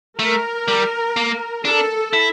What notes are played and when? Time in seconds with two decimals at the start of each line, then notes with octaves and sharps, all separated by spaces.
0.19 A3 A#4
0.68 G3
1.16 A#3
1.65 D4 A4
2.13 E4